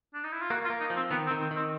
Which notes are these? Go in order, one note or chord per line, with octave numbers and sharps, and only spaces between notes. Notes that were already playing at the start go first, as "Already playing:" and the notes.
D4
D#4
E4
F4
A#3 F#4
F4
A#3
D#4
F3
C4
D#3 B3
C4
D#3
C4
D#3
C4